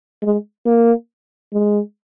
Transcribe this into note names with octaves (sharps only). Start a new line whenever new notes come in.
G#3
A#3
G#3